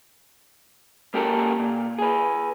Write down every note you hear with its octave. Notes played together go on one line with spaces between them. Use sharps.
A#3 G4 A4 A#4
A#2
G#4 B4